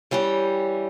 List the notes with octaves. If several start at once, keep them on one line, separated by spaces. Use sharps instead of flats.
E3 G3 C#4 G4